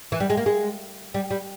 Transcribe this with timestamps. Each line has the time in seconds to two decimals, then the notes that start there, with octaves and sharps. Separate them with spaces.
0.12 E3
0.20 G3
0.30 G#3
0.37 A#3
0.46 G#3
1.14 G3
1.31 G3